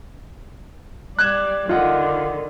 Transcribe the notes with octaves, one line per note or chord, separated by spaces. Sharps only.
G3 D5 F#6 G#6 E7
D3 D#3 F4 D#5 F#5